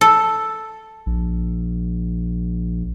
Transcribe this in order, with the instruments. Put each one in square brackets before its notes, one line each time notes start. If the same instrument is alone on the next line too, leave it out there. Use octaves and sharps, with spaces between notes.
[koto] A4
[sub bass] A#1